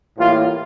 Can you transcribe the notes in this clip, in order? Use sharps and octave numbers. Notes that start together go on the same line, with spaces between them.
A2 E3 G3 A#3 F4